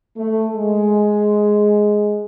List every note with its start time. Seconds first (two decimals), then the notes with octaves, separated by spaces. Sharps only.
0.17 A3
0.55 G#3